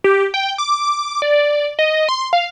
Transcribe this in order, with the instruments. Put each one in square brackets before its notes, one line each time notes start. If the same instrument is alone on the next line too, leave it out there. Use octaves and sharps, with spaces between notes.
[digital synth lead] G4
G5
D6
D5
D#5
C6
F5